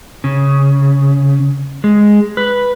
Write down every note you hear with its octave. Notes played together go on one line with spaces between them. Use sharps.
C#3
G#3
B4